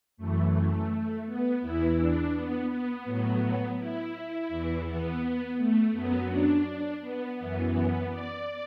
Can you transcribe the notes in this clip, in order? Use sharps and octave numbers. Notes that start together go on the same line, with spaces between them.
F#2 E3 A3
B3
E2 E3 E4
D4
B3
B3
A2 F#3
E4
E2 E3
B3
A3
F#2 F#3 B3
D4
B3
F#2 E3 B3
B3
D5